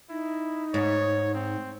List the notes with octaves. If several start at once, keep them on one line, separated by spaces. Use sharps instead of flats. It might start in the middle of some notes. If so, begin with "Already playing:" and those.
D#4 E4
G#2 C#5
C4